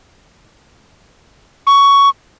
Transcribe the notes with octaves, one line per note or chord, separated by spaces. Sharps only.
C#6